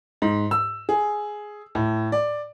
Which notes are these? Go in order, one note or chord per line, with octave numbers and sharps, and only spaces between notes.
G#2
E6
G#4
A2
D5